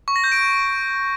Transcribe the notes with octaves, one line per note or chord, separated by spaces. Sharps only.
C#6
A#6
G6
D7